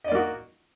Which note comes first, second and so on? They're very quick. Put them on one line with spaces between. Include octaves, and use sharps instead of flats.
D#5 D5 A#3 F#4